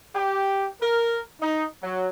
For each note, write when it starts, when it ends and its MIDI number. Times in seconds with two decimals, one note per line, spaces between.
0.14 0.66 67
0.81 1.19 70
1.40 1.65 63
1.81 2.07 54